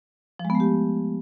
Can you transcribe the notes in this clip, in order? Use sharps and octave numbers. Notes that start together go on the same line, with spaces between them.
F3
G#3
B3
A3
G4